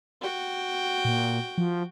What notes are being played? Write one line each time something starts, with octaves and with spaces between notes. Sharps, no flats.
F#4 G5
A#2
F3